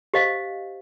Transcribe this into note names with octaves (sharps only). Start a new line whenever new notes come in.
G4 C5 D#5 F5